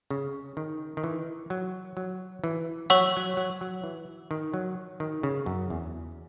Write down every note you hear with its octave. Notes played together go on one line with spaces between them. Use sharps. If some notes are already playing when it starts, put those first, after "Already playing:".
C#3
D#3
D#3
E3
F#3
F#3
E3
F#3 C#5 F#5 C#6 E6
F#3
F#3
F#3
E3
D#3
F#3
D#3
C#3
F#2
E2